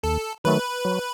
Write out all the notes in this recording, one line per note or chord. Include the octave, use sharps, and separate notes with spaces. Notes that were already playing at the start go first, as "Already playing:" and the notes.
D#2 A4
D#3 F#3 A3 B4
F#3